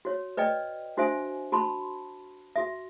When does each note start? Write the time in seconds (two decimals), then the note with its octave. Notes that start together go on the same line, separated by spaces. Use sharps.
0.05 F#4 C#5
0.37 B4 D5 D#5 G5
0.97 D4 F#4 C5 E5 G#5
1.52 F#4 A5 B5 C6
2.56 F#4 E5